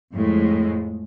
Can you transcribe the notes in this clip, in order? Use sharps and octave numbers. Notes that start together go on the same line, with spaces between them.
F2 A2 G#3